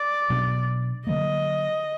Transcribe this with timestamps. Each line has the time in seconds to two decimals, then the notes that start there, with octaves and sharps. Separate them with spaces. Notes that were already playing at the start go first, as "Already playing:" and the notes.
Already playing: D5
0.30 B2 F#3 B3 D4
1.06 D3 F#3 A#3 D#5